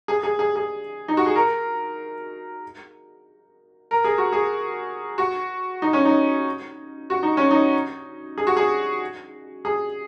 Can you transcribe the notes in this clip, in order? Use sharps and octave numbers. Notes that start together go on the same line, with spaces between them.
G#4
G#4
G#4
G#4
D#4
F#4
G#4
A#4
A#4
G#4
F#4
G#4
F#4
D#4
C#4
D#4
F#4
D#4
C#4
D#4
G#4
F#4
G#4
G#4